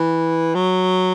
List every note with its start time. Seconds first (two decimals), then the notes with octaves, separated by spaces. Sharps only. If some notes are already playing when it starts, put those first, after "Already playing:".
Already playing: E3
0.55 F#3